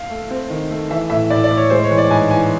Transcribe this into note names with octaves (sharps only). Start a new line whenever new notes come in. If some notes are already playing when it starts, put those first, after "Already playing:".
Already playing: F5
A3
C4
D#3
A3
E3 E5
A2 E5
A2 D5
D5
A2
C#5
G#3 C5
C#5
E3
D5
G#2 G#5
E3 G#5